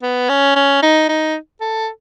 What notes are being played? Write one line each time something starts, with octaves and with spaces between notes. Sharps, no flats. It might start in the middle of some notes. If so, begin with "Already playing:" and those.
B3
C#4
C#4
D#4
D#4
A4